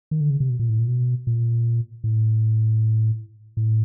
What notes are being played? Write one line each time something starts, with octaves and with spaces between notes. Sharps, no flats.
D#3
D3
C#3
C3
B2
A#2
A2
A#2
B2
A#2
A2
A2